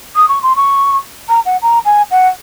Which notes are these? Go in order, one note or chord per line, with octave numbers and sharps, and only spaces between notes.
D#6
C#6
C6
C#6
A#5
F#5
A#5
G#5
F#5